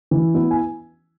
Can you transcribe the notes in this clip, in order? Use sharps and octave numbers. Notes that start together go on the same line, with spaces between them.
E3
B3 E4
G#5